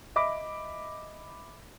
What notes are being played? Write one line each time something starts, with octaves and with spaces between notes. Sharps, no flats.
D#5 E5 B5 D6